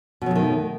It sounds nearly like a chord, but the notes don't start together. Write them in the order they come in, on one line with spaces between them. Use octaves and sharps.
B2 F#3 A3 D#3